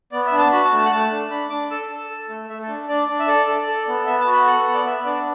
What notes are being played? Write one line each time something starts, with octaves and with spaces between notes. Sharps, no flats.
B3 D5
E5
D4
A5
F#4 B5
A5
A3
A5
F#5
A3 A5
D4
D4 B5
D4 D6
A4 E6
A4
A4
A3
A3 E5
A4
D4
D4 D5
D4
E5
A4 D5
A4
A4
B3
B3 E5
A5
F#4
B5
A4 F#5
B3
D5
B3 E5
D4 D5